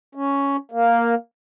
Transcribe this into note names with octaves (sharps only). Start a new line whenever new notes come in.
C#4
A#3